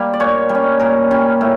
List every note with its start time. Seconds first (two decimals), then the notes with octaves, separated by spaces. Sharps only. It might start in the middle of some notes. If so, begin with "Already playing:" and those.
Already playing: G3 A#3
0.13 D5
0.20 A#2 C#5
0.49 G3
0.55 C#4
0.79 A#2 A#4
1.11 G3 C#4
1.41 A2